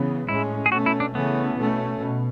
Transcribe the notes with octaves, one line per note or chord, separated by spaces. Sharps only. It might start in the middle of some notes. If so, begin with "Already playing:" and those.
Already playing: C#3 E3 B3
A2 G#3 C#4 E4
G#4
B2 A3 C#4 F#4
E4
D4
C#3 E3 A3 B3 C#4
B2 A3 C#4
B2